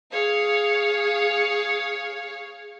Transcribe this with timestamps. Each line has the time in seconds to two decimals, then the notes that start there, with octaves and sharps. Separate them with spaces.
0.12 G#4 C#5 F5